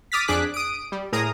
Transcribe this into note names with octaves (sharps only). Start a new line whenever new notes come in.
D6 D#6 F6 A6 B6
F2 D4 G#4 D6 F#6 B6
D#6 D7
G3
A2 G#4 A#4 A#5 D#6